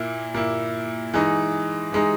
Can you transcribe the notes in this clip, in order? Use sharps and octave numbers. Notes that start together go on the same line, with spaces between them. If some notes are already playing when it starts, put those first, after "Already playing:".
Already playing: A#2 A#3 E4
A#2 A#3 E4
E3 G#3 D#4
E3 G#3 D#4